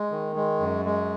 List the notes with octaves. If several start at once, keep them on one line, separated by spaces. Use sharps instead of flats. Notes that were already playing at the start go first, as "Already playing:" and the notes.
Already playing: G#3
D#3
G#3
F#2
G#3